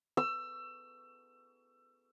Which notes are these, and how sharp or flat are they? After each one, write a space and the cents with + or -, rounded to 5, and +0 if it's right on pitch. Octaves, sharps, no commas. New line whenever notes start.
E6 +25